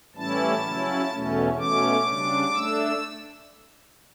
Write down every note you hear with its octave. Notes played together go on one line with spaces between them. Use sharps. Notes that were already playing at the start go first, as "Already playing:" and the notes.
A2 E3 G3 C#4 E4 A5
C#3 F#3 C#4 E4
E2 B2 A3 C#4
B2 A3 C#4 D6
C#3 G3 D4
A3 D4 E6